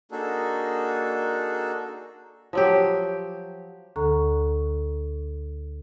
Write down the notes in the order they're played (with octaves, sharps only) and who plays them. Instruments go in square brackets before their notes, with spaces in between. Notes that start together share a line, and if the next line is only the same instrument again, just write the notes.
[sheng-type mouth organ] A#3 D4 D#4 F#4 G#4 A4
[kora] F3 F#3 G4
[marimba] D2 D3 A4 A#5 C#6